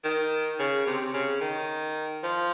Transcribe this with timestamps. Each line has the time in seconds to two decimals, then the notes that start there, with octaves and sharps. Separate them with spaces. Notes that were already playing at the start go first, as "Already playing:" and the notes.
0.04 D#3
0.60 C#3
0.87 C3
1.14 C#3
1.41 D#3
2.24 F3